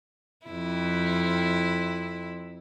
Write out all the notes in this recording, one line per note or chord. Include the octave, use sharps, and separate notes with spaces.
F2 E4